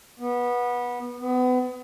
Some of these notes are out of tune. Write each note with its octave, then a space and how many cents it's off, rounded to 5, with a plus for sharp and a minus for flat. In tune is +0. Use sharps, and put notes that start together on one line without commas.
B3 -20
B3 +30